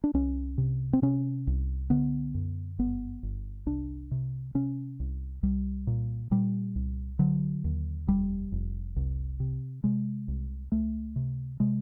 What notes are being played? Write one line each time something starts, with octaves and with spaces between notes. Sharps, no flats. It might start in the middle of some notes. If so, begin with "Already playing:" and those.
D4
C2 C#4
C3
C4
C3 C#4
C2
D3 B3
F#2
G1 B3
G1
C2 D4
C3
C3 C#4
C2
C2 G3
A#2
A#2 G3
C2
D3 F#3
D#2
F1 G3
F1
C2
C3
C3 G#3
C2
C#2 A3
C3
C3 G#3